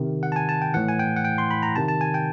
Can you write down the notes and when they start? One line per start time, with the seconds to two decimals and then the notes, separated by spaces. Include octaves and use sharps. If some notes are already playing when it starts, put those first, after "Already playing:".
Already playing: C3 D#3
0.23 F#5
0.32 A5
0.36 G#5
0.49 A5
0.62 G5
0.74 A2 E3 F#5
0.88 G#5
0.99 G5
1.16 F#5
1.25 G5
1.38 C6
1.51 B5
1.63 A#5
1.76 C3 D#3 A5
1.88 A5
2.01 G#5
2.14 G5